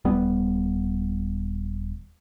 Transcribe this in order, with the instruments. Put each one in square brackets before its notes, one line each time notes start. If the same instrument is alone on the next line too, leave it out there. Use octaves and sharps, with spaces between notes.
[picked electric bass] D#1 G3 B3